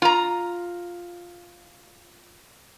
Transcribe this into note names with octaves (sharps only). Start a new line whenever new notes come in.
F4 A#5